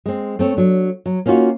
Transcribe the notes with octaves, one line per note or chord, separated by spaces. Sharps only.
G#3 C4
A3 C4 C#5
F#3 D4
F#3
A#3 C#4 D#4 F4 F#4